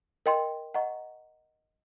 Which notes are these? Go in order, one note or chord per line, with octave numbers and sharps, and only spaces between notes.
A#4 D#5 G5 C6
D#5 F#5 A#5 C#6